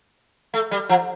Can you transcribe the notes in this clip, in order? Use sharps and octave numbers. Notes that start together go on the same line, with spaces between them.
A3
G3
F3